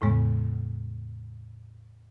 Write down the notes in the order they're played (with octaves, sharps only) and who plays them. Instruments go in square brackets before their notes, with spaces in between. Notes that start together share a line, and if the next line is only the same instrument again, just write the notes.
[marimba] E2 A2 C#3 G#3 B3